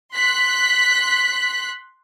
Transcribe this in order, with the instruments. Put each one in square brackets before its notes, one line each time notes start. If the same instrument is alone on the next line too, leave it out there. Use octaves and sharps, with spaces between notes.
[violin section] C6 F#6 B6